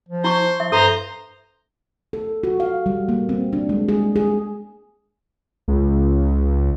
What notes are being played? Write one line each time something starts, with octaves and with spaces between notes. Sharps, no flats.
F3
E4 C5 C#6
F3 E5
G2 A4 C5 A#5
A4
F#4
F5
G3
A#3
C4
D4
G#3
G#4
G#4
C#2